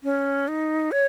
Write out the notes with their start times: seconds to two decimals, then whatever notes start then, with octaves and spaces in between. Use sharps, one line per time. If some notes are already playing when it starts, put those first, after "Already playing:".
0.04 C#4
0.48 D#4
0.92 C#5